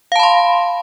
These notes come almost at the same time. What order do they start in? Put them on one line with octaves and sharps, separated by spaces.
F5 A5 B5 C6